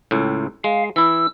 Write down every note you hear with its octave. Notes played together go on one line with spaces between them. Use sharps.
C#2 A2
G#3 F5
E3 E4 E6